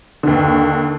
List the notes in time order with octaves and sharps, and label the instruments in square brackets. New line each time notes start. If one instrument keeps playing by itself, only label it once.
[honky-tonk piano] D#2 D3